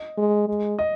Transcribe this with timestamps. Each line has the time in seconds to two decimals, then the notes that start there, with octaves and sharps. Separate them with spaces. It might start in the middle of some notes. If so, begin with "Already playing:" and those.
Already playing: D#5
0.18 G#3
0.48 G#3
0.79 D#5